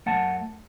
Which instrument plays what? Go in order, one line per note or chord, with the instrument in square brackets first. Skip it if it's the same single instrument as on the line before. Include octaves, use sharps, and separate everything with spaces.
[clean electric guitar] F#2 D#3 A3 F#5 A5